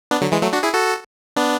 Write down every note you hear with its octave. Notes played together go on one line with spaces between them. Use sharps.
B3 D4
D3 F#3
E3 G#3
F#3 A3
D4 F#4
E4 G#4
F#4 A4
B3 D4